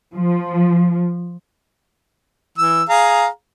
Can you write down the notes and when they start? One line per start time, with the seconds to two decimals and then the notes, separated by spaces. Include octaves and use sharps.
0.13 F3
2.58 E3 E6
2.89 G#4 F5 A#5